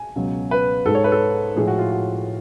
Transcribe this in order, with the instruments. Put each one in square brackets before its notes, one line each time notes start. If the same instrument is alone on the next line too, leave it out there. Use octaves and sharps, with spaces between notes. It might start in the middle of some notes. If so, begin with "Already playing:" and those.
Already playing: [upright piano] G#5
C#2 B2 F#3
B4
G#2 G#3 A4
C#5
B4
A4
A2 F3 G#3 G#4
F#4
F4
F#4